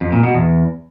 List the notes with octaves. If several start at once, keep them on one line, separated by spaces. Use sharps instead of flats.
F2
A#2
B2
E2